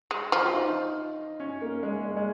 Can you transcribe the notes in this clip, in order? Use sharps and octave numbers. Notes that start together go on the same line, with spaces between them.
G#3
F3
F4
D#4
C#4
A#3
G#3
G#3
G#3